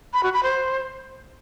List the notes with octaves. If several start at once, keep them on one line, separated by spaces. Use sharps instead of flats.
B5
F#4
B5
C5